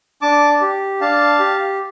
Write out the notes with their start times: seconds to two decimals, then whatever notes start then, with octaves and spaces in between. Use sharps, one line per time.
0.22 D4 A5 D6
0.61 G4
1.01 D4 F5 A5
1.39 G4